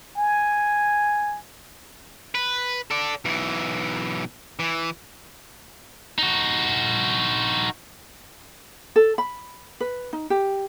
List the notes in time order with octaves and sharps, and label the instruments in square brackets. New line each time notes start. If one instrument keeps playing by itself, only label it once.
[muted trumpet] G#5
[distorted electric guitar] B4
A4 D5
B1 E3
E3
D#4 F#4
[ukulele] A4
B5
B4
D#4
G4